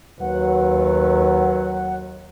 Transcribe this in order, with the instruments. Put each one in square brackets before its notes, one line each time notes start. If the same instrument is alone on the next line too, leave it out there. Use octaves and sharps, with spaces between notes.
[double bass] D#2 [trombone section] F#3 [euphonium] B4 [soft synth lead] F#5